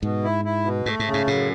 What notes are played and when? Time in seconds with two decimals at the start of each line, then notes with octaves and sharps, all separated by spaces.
0.03 G#2 B2
0.24 E4
0.45 E4
0.65 B2
0.86 G#2 A3
0.99 G#2
1.07 C#3
1.14 G#2
1.27 F#2 A2